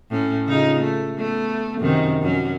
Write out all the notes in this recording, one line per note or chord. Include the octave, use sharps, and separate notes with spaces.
A2 C#4
C#3 D#4 F4
A3
A3 B3
F#2 C3 D#3
F#2 F#3 C#4